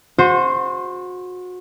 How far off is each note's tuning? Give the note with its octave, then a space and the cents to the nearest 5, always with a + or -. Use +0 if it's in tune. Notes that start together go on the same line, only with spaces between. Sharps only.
F#4 -30 C5 +0